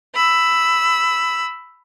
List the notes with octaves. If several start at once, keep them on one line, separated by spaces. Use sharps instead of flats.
B5 E6